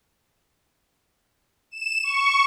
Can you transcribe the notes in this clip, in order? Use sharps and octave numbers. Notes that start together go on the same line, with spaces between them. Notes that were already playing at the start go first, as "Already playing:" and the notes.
E7
C#6